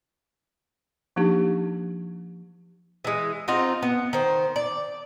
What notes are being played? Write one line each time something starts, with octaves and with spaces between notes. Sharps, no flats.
F3 A#3 D4 D#4 G4
E3 G#3
C4 D#4 F4 F#5
B3
D#3 C5
D5